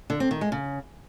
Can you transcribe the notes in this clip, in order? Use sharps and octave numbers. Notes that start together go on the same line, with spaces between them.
D3
C4
D#3
G#3
C#3